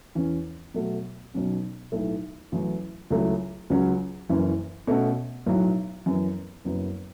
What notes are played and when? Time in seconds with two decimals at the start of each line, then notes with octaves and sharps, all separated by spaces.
0.15 E2 E3 C#4
0.74 B2 F#3 A3 F#4
1.34 B1 B2 F#3 C#4
1.92 B1 A2 A3 E4
2.52 A1 A2 F#3
3.10 C#2 C#3 F#3 A3 E4
3.70 C#2 C#3 F#3 C#4 F#4
4.29 F#1 F#2 E3 C#4
4.87 B2 A3 C#4 F#4 A4
5.46 B1 A2 F#3
6.06 F#2 E3 B3
6.65 F#1 F#2 F#3 B3